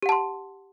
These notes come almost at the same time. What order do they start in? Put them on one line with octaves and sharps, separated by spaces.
G4 F#5 A5 C6